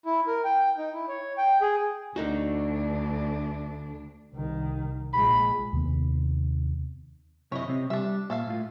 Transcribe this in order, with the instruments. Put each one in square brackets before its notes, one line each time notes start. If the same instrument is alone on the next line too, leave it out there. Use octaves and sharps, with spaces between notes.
[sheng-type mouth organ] E4
A#4
G5
D#4
E4
C#5
G5
G#4
[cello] D2 D4 [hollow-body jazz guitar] D3 D#4 F#4
[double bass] C2 D#3
[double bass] A#1 G#3 [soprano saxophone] B5
[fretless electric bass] D#2 C3 D#3 B3
[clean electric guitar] F#2 C3 E4 [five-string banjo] C#5 D#5
[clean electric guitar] C3 C4
[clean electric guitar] G3 [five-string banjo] D4 E5
[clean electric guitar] A#2 [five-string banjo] A4 E5 F5
[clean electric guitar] A2 F4